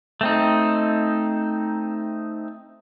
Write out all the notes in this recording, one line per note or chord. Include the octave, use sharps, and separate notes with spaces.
A3 C4 D#4